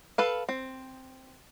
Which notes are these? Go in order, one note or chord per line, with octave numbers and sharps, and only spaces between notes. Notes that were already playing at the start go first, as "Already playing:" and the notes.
A4 B4 F5
C4